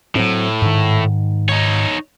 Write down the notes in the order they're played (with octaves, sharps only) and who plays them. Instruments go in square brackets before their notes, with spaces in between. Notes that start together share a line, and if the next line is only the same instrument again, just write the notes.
[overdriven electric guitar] A2 [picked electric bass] F#3 C4
[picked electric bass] G#2 D#3
[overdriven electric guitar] D#4 C#5